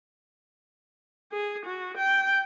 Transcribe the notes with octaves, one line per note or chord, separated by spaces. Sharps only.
G#4
F#4
G5